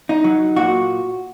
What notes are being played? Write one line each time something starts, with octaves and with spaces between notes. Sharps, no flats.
D#4
F#3
A#2 F#4